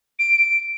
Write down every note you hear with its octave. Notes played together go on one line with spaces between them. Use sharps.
D7